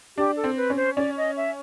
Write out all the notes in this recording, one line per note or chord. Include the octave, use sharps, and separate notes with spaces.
D4 G4
A4
C4
B4
C#4
C5
C#4 D5
D#5
E5